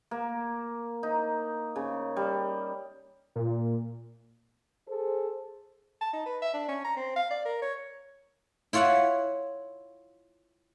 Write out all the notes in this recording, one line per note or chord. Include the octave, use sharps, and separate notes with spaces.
A#3
D#4
C#3
G3
A#2
G#4 A4 C5
A5
D#4
B4
E5
D4
C#4
A#5
C4
F5
D5
A#4
C#5
E4 F4 C#5 E5 F#5